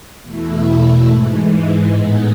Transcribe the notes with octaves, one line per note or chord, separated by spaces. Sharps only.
E2 B2 A3 E4
G#2 E3 G#3
A2 G#3 B3 D#4